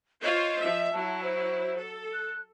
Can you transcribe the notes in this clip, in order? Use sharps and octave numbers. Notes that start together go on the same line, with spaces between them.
F4 C5 C#5 D#5
F3 E5
F#3 E4 A5
C5
A4
F#6